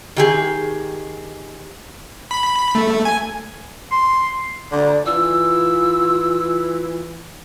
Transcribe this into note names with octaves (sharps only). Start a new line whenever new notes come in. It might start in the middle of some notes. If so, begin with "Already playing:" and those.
D#3 G4 G#4
B5
A3
G#5
C6
D3 D5
E3 F4 E6